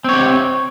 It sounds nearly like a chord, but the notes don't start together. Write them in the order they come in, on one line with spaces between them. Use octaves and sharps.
C4 C#5 G4